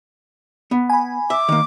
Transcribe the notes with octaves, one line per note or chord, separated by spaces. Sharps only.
B3
G#5 B5
E5 D6
D#3 A#3